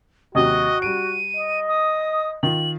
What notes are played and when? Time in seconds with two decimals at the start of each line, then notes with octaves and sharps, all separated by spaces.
0.35 D#2 C3 F#3 F#4 D#5
0.82 G3 D7 D#7
1.37 D#5
1.69 D#6
2.43 D#3 F4 F#7